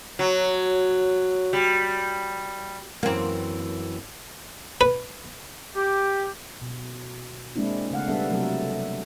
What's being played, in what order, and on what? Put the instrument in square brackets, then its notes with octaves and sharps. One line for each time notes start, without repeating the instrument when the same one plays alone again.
[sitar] F#3
G3
[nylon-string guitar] F#2 E3 G5 [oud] A#3 C4
[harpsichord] B4
[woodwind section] G4
[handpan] B2
G#3 A#3 C4 D4 E4
C#3 A3 F5 F#5
G3 B3 D4 A4 E5
C3 F#3 G3 A3 A4 A#4
E5